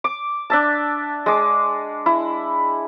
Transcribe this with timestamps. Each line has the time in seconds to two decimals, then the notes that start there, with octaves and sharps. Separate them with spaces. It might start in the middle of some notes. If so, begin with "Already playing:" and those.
0.04 D6
0.50 D4 E5 A5
1.26 G#3 D6
2.06 E4